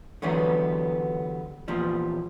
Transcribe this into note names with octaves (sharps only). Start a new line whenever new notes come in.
D3 E3 F#3 G3 B3
E2 A#2 F3 G3